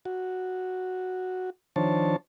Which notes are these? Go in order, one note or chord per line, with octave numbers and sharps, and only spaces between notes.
F#4
D#3 F3 D4 C5 C#5 A5